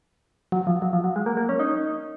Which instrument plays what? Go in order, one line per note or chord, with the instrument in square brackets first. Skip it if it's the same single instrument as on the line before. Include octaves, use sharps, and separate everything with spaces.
[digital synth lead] F#3
F3
F#3
F3
F#3
G#3
A#3
A#3
C#4
D#4